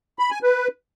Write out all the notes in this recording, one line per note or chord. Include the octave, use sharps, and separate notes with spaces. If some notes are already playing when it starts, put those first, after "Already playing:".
B5
G#5
B4